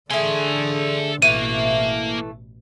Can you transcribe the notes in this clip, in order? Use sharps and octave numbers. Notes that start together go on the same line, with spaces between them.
D3 A3 D4 G#4 A4 C6
A1 B2 E3 A3 A#3 F5 D#7